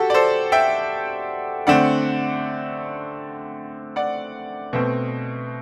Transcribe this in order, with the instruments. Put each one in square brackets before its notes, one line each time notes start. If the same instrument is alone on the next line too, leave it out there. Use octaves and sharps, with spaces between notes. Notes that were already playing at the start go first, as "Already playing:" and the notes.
Already playing: [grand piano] F#4 G4 A4
D5
A4 C5
E5 G5
D3 A3 C4 D5 F#5
D5 F#5
B2 A3 C4